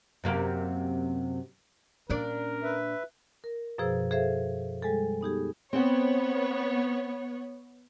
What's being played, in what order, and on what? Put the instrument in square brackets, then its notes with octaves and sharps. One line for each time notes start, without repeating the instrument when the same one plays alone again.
[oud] F#2 C3 A#3
[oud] A#2 D4 D5 [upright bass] C#4 [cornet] A#4
[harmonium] B4 E5
[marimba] A#4
F#2 B2 F3 G#4 C5 E6
G#4 A4 C5 E5 F5
G3 G#3 G#4 A4
B3 D#4 G4 G#4
[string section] B3 C#5 [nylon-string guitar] C4 C5 F#5